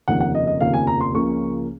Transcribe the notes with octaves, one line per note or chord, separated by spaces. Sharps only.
F1 D#2 C#3 F3 A#3 F#5
F#5
D#5
D#5
F1 D#2 C#3 F3 A#3 F5
G#5
A#5
C6
C#2 C#3 F3 A#3 C#4 C#6